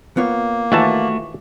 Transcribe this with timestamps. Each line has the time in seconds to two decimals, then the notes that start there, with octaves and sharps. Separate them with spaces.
0.17 A#3 B3 F4 C#5
0.72 D#2 E3 A3 F4 F#4 A5